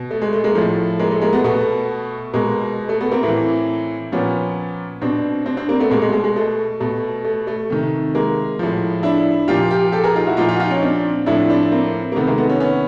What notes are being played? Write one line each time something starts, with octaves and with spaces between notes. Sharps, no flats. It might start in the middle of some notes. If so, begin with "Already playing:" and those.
Already playing: B2
A3
G#3
A3
G#3 A#3
A2 F3 A3
G#3 A#3
A3
G#3 A#3
A3 B3
B2 A3 B3
B2 G#3 A#3
A3
A3 B3
A#3 C4
A2 E3
A#2 F3 B3 C#4
B2 C4 D4
C4 D4
C4 D4
A#3 C4
A3 B3
B2 G#3 A#3
G#3
A3
G#3
G#3
A3
B2 A3
A3
A3
C3 D#3
G#3 A#3
A2 F3
D4 E4
A#2 F3 F4 G4
F4 G4
G4 A4
G#4 A#4
D#4 F4
E4 F#4
A#2 F3 D#4 F4
D#4 F4
F#4
D#4 F4
C#4 D#4
C4 D4
A2 F3 D4 E4
C4 D4
A#3 C4
A#3
C3 D#3 A3 B3
G#3 A#3
A3 B3
B3 C#4
B3 C#4